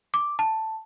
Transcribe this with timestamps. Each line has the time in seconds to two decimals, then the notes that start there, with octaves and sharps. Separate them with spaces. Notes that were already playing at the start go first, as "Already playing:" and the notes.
0.14 D6
0.39 A5